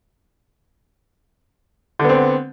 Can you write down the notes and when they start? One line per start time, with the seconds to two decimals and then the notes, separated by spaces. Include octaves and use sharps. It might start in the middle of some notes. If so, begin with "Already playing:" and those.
1.99 D3
2.04 B3
2.09 C4